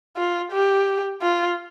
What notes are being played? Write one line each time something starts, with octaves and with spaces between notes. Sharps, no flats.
F4
G4
F4